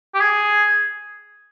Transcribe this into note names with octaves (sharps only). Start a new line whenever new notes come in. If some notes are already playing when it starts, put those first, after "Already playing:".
G4
G#4